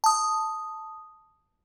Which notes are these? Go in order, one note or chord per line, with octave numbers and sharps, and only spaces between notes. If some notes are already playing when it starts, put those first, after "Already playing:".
A5 D#6